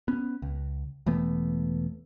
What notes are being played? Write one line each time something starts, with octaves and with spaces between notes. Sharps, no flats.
B3 C#4
C#2
E1 E3 A3 B3